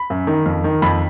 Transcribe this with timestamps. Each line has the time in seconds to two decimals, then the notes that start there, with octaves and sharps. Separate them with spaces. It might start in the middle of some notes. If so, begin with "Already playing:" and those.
Already playing: B5
0.10 F#2
0.27 D#3
0.46 F2
0.64 D#3
0.82 F2 B5